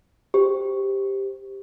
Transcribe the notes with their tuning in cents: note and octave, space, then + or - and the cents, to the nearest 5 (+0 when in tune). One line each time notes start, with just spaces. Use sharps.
G4 +5 C5 +0